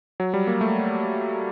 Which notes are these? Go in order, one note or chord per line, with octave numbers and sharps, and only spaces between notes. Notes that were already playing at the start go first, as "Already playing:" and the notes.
F#3
G3
A#3
A3